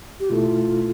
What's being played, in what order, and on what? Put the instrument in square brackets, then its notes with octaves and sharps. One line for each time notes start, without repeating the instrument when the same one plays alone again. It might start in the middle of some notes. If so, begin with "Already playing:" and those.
[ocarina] G4
[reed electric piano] B2 A3 E4 A4 [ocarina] F4